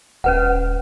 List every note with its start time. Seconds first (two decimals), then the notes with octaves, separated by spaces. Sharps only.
0.24 D#1 C#4 B4 F#5